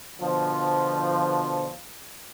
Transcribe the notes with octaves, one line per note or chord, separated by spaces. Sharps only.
B2 D3 F3